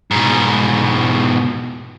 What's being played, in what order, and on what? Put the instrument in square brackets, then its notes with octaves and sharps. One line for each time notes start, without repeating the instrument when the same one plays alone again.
[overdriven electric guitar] G#2 B2